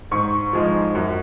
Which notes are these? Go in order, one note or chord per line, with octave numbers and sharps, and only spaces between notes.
G#2 C#6
F3 G#3 D#4
F#2